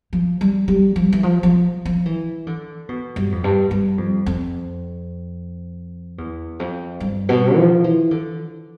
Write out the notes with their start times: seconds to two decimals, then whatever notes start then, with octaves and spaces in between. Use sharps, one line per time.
0.13 F3
0.41 G3
0.68 G3
0.96 F3
1.12 E3
1.23 F3
1.43 F3
1.85 F3
2.06 E3
2.47 D3
2.89 B2
3.16 G2
3.32 F2
3.44 G2
3.71 G2
3.98 F2
4.26 F2
6.18 E2
6.59 F2
7.00 G2
7.29 B2
7.57 F3
7.84 E3
8.11 D3